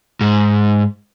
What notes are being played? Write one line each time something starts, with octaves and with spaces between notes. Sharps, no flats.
G#2